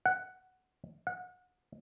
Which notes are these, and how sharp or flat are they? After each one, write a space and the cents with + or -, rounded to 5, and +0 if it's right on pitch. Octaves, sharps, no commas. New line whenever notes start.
F#5 +5
F#5 -30